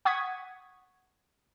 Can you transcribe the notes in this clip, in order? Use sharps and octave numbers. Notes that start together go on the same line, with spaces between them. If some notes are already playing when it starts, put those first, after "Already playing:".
F#5 C#6 D#6 G#6 B6